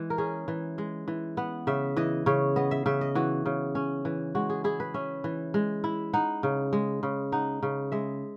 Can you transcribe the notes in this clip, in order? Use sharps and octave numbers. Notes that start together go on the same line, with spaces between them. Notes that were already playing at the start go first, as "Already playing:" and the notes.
Already playing: E3 G#3
A#4
C#4 G#4
E3
G#3
E3
B3 F#5
C#3 E5
E3 D#5
C#3 C#5
B3 D#5
E5
C#3 E5
D#5
E3 F#4
C#3
C#4
E3
G#3 F#4
G#4
E4 G#4
B4
C#4 E5
E3
G#3
E4
D#4 F#5
C#3
G#3
C#3
D#4 F#5
C#3
G#3 E5